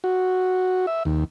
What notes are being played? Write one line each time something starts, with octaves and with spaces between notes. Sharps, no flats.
F#4
E5
D#2